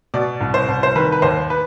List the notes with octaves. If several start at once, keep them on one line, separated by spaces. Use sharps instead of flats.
B2 D5
C2
C5
C2
C5
D#3 B4
B4
D#2 C5
B4